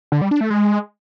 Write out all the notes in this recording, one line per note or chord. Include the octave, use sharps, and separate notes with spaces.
D3
G3
D4
A3
G#3